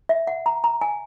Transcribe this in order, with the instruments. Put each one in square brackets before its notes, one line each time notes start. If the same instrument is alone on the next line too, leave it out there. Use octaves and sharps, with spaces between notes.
[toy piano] E5
F#5
A#5
A#5
G#5